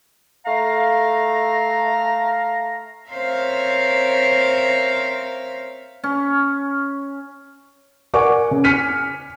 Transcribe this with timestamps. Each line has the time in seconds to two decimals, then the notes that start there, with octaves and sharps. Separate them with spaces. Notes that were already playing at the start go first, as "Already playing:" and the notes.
0.46 A3 F5 A#5
3.10 C4 A#4 C5 C#5 E5 F5
6.04 C#4
8.14 A#4 D5 F#5 G#5 C#6 D6
8.51 C#3
8.64 G#5 F6 B6 C#7 D#7